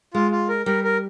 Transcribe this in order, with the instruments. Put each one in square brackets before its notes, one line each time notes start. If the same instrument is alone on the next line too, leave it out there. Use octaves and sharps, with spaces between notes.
[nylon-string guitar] G#3 [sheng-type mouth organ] F4
[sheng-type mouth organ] F4
A#4
[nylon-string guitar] G3 [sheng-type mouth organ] A#4
[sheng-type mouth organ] A#4